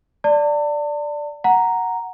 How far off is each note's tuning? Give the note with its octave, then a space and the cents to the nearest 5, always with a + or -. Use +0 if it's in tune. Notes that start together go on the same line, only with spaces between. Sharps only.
D5 +0 A5 +40
F#5 +0 A#5 +0